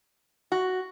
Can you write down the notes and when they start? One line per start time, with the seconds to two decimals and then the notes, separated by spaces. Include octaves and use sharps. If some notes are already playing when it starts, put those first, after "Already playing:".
0.52 F#4